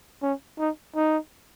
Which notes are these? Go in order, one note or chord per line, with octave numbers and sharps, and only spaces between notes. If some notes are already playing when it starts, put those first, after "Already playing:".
C#4
D#4
D#4